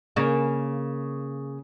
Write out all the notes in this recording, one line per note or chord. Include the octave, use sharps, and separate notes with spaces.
C#3 A#3